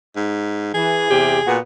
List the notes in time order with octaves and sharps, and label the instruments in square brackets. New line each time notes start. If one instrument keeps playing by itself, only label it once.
[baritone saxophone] G#2
[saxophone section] E3 [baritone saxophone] G#4
[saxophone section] E2 C3 G4
A#2 B3 F#4